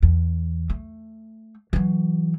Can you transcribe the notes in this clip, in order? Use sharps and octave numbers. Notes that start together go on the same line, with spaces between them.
E2
A3
E3 F#3